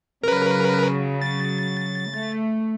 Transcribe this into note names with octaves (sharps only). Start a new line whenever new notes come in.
C#3 F#3 A#4 B4
A6
A3